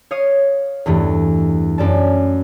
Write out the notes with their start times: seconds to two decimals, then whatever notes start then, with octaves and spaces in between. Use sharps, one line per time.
0.11 C#5 F5 D#6
0.86 E2 G2 E3 A3
1.78 F#2 D5 A5